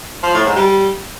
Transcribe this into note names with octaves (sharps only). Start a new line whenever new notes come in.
F3
A2
G#2
G3